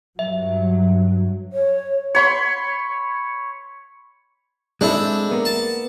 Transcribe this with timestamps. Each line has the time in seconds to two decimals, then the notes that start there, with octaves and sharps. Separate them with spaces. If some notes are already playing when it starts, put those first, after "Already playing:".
0.19 G2 F#3 E5
1.53 C#5
2.15 C#5 B5 C6
4.81 G#3 C4 D4 E4 A4
5.31 A#3 B3
5.45 A5